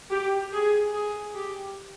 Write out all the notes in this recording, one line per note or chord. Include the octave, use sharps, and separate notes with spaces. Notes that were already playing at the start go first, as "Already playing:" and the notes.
G4
G#4
G#4
G4